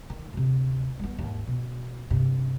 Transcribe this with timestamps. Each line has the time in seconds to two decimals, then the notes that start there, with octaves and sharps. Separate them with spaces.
0.10 D#3
0.33 D2 C3
0.99 G3 B3
1.18 D#2 G#2
1.47 B2
2.10 G2 C3